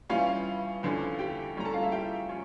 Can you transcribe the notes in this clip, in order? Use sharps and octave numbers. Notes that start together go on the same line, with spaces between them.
G2 E3 G3 C#4 F4 F5
E2 D3 F3 C#4
G4 G5
A2 G3 C#4 A#5
A4 A5
F4 F5
E4 E5
G4 G5
F3 C#4